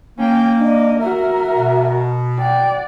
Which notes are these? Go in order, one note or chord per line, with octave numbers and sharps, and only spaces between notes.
A#3 C#4 G5
D4 D#5
F#4 A#4 E5
B2
D5 F#5 G5